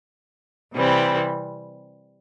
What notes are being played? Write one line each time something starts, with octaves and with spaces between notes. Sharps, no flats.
C3 E3 G3 C4